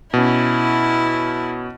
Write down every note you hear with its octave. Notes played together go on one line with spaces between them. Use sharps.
B2 C#4 E4